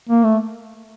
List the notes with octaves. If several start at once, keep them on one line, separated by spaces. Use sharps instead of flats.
A#3
A3